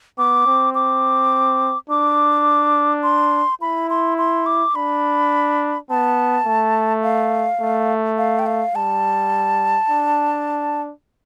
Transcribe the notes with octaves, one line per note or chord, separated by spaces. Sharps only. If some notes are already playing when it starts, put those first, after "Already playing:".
B3 D6
C4
D6
D4 D6
C6
E4 B5
C6
C6
D6
D4 B5
B3 A5
A3
F5
A3
F5
G5
F5
G3 A5
D4